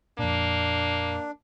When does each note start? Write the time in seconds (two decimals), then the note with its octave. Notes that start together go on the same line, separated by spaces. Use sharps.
0.19 F2 A#2 A#3 D4